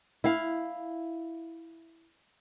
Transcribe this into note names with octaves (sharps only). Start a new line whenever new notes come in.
E4 F5